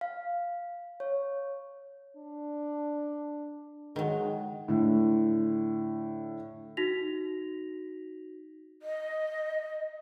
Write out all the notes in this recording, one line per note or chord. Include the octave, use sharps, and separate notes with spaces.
F5
C#5
D4
D#3 F#3 G#3
A2 D3
D#4 F#4 A#6 B6 F7
D#5